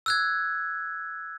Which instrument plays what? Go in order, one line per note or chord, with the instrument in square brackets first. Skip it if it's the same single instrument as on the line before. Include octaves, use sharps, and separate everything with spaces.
[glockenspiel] E6 F#6 G#6